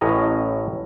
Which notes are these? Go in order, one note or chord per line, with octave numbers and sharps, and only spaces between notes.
A1 A2 C#4 D#5 A#5